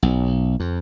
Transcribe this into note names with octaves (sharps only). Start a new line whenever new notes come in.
B1
F2